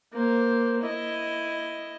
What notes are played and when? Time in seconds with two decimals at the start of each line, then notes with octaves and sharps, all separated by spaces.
0.13 A#3 C5
0.82 E4 D#5